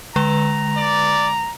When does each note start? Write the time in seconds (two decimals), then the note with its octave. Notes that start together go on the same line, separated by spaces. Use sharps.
0.16 D3 G#3 B4 A#5
0.77 D5